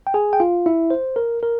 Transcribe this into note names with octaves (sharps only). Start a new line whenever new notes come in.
G5
G#4 G#5
G5
F4 F5
E4 E5
C5
A#4
A#4